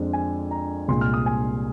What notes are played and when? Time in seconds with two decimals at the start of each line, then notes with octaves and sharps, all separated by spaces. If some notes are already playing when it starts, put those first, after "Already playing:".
Already playing: F2 D3 G#3 D4 F4
0.13 G#5
0.51 A#5
0.88 C2 A#2 G#3 C6
1.01 F6
1.14 D#6
1.26 G#5